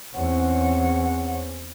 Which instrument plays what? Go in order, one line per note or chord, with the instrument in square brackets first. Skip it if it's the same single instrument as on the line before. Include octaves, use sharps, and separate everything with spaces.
[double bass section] E2 C4 C#4 [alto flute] F#5